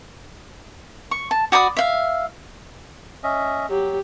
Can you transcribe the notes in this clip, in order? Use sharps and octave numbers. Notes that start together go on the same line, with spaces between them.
C#6
A5
F#4 D5 B5 D#6
E5 F5
C#4 D#5 E5
F#3 G4